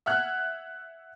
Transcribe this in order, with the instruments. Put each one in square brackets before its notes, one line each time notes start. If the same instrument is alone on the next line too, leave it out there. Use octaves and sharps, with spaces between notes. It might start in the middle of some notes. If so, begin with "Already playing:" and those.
[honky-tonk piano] E5 F#5 F6 F#6 G#6